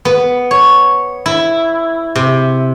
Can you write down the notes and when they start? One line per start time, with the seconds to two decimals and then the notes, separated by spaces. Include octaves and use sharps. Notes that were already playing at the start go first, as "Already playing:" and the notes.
0.05 B3
0.51 C#5
1.26 E4
2.16 C3